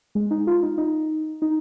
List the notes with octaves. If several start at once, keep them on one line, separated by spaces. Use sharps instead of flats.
G#3
D#4
F4
D#4
D#4
D#4